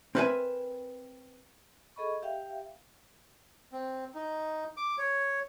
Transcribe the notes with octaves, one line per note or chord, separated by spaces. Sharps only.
C4 A#4 B4 D5 E5 G#5
G#4 A4 D#5 B5 C#6
G4 E5 F5 G5
C4
D#4
D6
C#5